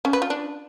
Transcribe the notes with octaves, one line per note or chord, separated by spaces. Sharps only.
C#4
B4
F4
D4